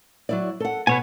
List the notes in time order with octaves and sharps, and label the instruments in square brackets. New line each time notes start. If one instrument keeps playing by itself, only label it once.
[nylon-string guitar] F#3 E4 D5
A4 F#5
[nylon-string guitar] B2 F#5 [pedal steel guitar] B4 C#5 G#5